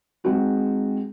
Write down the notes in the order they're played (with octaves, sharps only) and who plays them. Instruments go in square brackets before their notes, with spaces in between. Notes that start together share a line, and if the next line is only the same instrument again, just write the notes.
[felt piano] G#3 C4 D#4 F#4 G#4